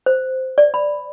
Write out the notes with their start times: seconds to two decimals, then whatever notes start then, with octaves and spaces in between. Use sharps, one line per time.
0.06 C5
0.58 D5
0.74 B5